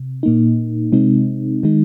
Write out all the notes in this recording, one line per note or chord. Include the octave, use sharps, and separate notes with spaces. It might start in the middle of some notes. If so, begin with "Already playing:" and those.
Already playing: C3
A#2 A#3 D#4
C3 G#3 C4 D#4
D#3 G#3 D#4